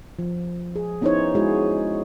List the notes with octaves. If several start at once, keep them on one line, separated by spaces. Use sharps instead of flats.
F3
G#4
B3 C#4 D#4 E4 C5 C#5
G#3 E4 F#4 G#4